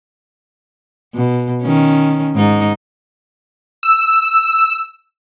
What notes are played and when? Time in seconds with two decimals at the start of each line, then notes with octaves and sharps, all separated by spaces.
1.15 B2
1.62 D#3 C#4
2.36 G#2 D#4
3.83 E6